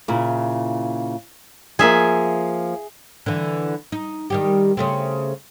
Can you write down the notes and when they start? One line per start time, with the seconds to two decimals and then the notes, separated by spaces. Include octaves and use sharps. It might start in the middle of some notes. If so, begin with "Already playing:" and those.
0.08 A#2 C#3 E4
1.79 F3 A#3 G#4 E5
3.26 D3 E3
3.92 D#4
4.30 D#3 G3 G4
4.77 C#3 A3 C4